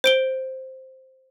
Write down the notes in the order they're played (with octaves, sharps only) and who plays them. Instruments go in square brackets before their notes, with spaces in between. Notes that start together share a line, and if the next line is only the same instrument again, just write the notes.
[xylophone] C5 D7 G7